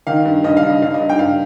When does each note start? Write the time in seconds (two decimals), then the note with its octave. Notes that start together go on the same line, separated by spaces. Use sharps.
0.07 D#3 F5
0.25 G2
0.44 G2 D#5
0.57 F5
0.63 G2
0.69 D#5
0.82 G2 F5
0.94 D#5
1.00 G2
1.09 G5
1.19 G2 F5